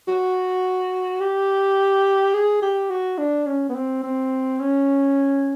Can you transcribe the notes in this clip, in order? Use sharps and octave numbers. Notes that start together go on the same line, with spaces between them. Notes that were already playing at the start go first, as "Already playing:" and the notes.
F#4
G4
G#4
G4
F#4
D4
C#4
B3
C4
C4
C#4